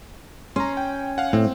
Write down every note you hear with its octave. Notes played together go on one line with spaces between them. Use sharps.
C#4 A#5 C6
G5
F5 F#5
A2 C4